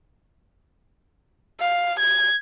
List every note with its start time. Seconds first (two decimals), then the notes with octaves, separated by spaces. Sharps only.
1.60 F5
2.00 G#6